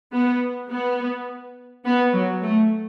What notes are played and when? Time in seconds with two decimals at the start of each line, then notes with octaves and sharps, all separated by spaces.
0.12 B3
0.69 B3
1.85 B3
2.13 F#3
2.42 A3